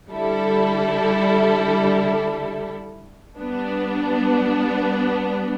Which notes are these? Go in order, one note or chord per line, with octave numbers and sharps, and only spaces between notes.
D3 G3 E4 A4
G3 B3 D4